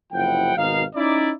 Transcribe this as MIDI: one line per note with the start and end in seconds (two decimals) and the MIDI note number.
0.13 0.56 30
0.13 0.56 48
0.13 0.56 53
0.13 0.56 64
0.13 0.56 78
0.13 0.56 79
0.57 0.84 32
0.57 0.84 47
0.57 0.84 51
0.57 0.84 63
0.57 0.84 77
0.95 1.32 61
0.95 1.32 63
0.95 1.32 64
0.95 1.32 74